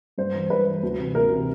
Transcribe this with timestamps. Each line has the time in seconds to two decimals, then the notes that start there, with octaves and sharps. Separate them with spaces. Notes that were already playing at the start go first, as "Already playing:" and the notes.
0.18 G2 C5
0.34 E3
0.50 G2 B4
0.66 E3
0.83 D2
0.98 C3 E3
1.15 D2 A#4
1.31 C3 E3